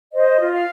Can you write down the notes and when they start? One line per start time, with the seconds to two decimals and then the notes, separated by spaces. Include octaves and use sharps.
0.14 C5 D#5
0.39 F4
0.52 F5